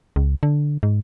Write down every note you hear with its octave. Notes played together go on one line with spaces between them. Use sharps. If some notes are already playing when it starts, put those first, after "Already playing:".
C#2
D3
G#2